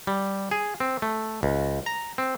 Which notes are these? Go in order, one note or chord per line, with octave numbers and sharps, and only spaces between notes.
G3
G#4
C4
A3
C#2
A#5
C4